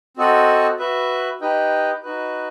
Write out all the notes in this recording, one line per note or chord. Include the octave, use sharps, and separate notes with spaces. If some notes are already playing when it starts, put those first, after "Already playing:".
C4 F#4 A4 D#5 F#5
F#4 B4 E5
D#4 G4 B4 D#5 G5
D#4 F#4 B4